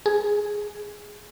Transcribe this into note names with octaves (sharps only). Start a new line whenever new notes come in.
G#4